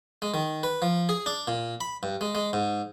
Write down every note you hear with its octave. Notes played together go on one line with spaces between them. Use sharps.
G#3
D#3
B4
F3
G#4
D4
A#2
B5
G2
G#3
G#3
G#2